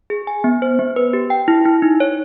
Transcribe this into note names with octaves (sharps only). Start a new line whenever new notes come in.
G#4
G#5
B3
C5
B3
B4
G4
G5
E4
E4
D#4
C#5